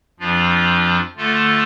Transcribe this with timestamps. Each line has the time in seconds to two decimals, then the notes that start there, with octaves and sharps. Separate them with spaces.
0.19 F2 F3 D4 F4
1.17 D3 A3 F4 A4